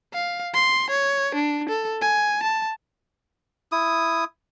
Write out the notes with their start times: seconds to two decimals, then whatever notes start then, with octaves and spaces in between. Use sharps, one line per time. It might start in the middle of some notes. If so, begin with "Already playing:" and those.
0.13 F5
0.54 C6
0.90 C#5
1.35 D4
1.69 A4
2.02 G#5
2.43 A5
3.72 E4 D#6